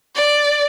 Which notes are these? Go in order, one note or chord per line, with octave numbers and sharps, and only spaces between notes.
D5